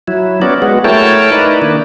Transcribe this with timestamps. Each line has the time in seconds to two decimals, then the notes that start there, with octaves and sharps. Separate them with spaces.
0.08 F#3 E4
0.42 B3 C#4 F#4 D5
0.62 G#3 B3 F#4
0.84 A3 E4 A#4 C#5 G5 A5
1.32 D#4 E4 A#4 B4 D5
1.62 D#3 A#3 D4